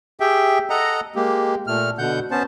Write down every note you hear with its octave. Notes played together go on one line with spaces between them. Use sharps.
G4 G#4 E5 G5
A4 D#5 F#5 A#5
G#3 A#3 G4
A#2 A3 F6
B2 D3 F#5 G6
B3 C#4 C5 A5